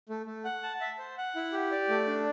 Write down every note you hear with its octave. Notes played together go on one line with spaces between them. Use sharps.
A3
A3
F#5
A5
E5
C5
F#5
E4
G4
D5
A3
D4